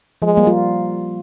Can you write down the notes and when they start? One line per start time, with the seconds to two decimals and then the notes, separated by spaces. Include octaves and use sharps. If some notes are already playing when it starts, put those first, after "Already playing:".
0.22 F3 G#3
0.37 G3 A#3
0.47 F4